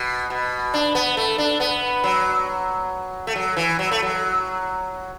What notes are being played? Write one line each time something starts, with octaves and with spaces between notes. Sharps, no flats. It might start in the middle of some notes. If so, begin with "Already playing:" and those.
Already playing: B2
B2
D4
B3
A3
D4
B3
F#3
A3
F#3
E3
F#3
A3
F#3